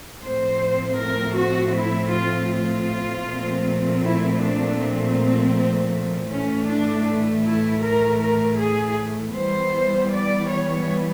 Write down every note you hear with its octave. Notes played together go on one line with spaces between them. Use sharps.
A2 F3 A3 C4 C5
A#4
F#4
E4
F4
F4
A#2 F3 A3 C4
E4
D4
C4
A2 E3 A3 C#4
D4
E4
A#4
A#4
G#4
E3 G3 B3 C5
D5
C#5